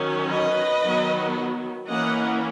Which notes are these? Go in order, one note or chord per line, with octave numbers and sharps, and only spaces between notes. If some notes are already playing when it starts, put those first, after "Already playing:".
Already playing: D#3 F#3 C#4
B4 D#5
D#3 F#3 B3
E3 A#3 C#4 D#5 F#5